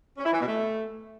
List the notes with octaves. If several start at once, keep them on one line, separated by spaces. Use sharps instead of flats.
C#4
E4
E3
B2
A3